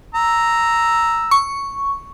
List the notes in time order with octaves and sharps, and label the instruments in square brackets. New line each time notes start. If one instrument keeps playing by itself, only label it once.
[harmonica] A#5 E6
[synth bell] C#6